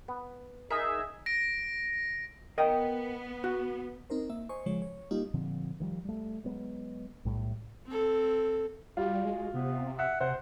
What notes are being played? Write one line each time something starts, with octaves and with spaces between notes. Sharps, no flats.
B3
D#4 G#4 A#4 D#5 E5 G#5
A#6 D7
B3 A#4 D#5 G5
F#4
C4 D#4 A#4 C5
A#3 E5
C5 D#5 G#5 C#6
C#3 F3 G#3 C#5
C#5
G3 A#3 D#4 F4 G4
A#2 D3 F3 C4
D#3 F3 G3
G3 A3
F#3 G#3 B3
B1 A2 G3
C4 A4
G3 F4 F#4
G#3
C3 B3
E5 F#5
C3 C5 F#5